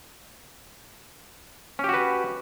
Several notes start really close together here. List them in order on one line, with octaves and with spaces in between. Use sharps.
C#4 G4 F#4 B4